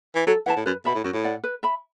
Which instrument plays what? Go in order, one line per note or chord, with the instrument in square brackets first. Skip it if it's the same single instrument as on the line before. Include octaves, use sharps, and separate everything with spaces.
[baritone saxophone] E3
[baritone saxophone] F#3 [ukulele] A4
[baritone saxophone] E3 [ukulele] F#5
[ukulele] A5
[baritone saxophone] A2
[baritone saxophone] F#2 [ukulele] B4
[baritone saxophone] B2 [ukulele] E5 B5
[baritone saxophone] A2
[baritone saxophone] F#2 [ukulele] F#4
[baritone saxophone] A2
[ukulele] D5 F#5
B4
E5 B5